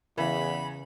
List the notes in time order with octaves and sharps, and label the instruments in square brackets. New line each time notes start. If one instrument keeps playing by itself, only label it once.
[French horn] E2 [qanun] C#3 [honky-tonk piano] E3 [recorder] B5